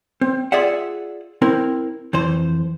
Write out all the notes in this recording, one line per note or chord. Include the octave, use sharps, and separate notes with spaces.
C4
F4 G#4 D5 E5 F#5
C4 E4 A#4
F2 E3 C5